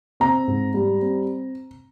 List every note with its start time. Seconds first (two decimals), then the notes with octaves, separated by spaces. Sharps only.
0.20 C4 A#5
0.47 G#2
0.74 G3
1.02 C4